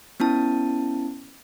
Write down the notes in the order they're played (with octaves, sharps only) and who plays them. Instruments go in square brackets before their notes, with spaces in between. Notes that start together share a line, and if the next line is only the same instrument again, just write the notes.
[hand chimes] B3 C#4 E4 A5